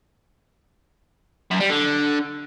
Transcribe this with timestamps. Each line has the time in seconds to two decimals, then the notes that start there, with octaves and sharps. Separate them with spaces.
1.51 F#2
1.60 G3
1.69 D3